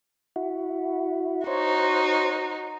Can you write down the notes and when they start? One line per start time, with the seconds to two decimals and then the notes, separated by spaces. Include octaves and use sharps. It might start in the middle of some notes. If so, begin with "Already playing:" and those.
0.36 E4 F#4
1.47 D#4 F#4 C5 C#5